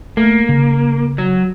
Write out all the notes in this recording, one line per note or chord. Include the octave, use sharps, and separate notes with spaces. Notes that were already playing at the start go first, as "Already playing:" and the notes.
A3 A#3
C#3
F#3